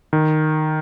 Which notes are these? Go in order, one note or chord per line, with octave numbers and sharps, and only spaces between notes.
D#3